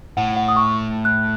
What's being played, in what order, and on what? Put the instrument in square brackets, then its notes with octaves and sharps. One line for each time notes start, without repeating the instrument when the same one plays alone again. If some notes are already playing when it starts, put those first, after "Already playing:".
[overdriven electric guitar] A2 [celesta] F#5
[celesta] F#5
D#6
C#6
F#6